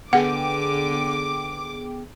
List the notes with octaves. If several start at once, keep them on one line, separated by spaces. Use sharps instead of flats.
D3 B3 G#4 F#5 G5 D6